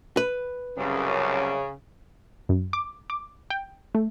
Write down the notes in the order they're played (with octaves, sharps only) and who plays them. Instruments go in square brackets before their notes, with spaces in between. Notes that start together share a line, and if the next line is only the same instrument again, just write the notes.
[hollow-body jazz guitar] B4
[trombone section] C2 F#2 [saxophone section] C#3
[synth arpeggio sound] F#2
D6
D6
G5
A3